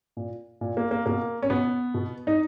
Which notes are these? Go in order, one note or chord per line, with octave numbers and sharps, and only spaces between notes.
A#2
A#2
A#3
A#3
B2 A#3
C#4
B2 B3
B2
D#4